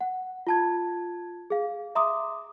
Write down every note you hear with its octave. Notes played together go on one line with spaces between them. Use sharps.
F#5
F4 A5 G#6
G#4 F5
E5 A#5 C6 D6 D#6